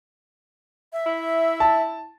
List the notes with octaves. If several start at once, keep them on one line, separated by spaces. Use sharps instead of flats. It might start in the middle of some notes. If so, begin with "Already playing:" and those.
E5
E4
A5